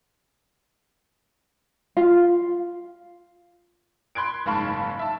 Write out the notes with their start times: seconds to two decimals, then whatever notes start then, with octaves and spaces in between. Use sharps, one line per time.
1.97 F4
4.15 B5 C6 F#6 G#6 D7
4.46 F#1 G#2 F5 A5 B5 C#6
4.99 E5 A5